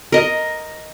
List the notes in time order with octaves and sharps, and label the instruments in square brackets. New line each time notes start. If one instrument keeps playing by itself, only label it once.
[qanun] A#4 D#5